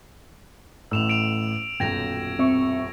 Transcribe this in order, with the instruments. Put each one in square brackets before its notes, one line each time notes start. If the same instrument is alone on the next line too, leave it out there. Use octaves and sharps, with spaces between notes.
[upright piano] A1 A2 [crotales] E6 E7 F7
[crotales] D7 F7
[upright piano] D#1 B1 F#2 [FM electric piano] G5 [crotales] G#6 A#6 F7
[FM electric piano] C4 E5 C#6